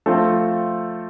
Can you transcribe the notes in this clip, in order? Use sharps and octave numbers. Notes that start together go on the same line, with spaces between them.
F3 A3 C4 F4 A4